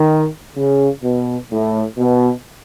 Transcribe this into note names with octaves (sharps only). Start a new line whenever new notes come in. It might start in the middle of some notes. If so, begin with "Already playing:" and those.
Already playing: D#3
C#3
B2
A2
B2